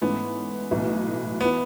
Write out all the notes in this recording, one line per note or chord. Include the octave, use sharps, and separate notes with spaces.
G#2 E3 A3 B3 C#4
B1 A2 E3 A3
B3
E3